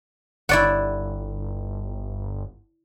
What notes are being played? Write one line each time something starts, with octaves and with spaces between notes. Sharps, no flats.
G1 E4 D5 F#5